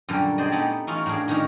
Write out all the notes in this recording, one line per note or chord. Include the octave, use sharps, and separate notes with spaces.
F#2 A#2 D3 G3 A4
G4 G#4 C5 D5 D#5
A3 B3 D#4 G4 A4 D#5
E3 C#4 D#4 F4
A2 A#3 D4 G#4
A#2 D#3 C#4 D#4 A#4